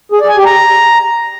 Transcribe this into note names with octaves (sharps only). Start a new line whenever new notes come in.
G#4
D5
G#5
G4
A#5